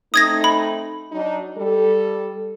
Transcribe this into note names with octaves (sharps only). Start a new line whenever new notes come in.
A3 C4 D#4 D#6 G#6 A#6
B5
F#3 D4 D#4
G3 A4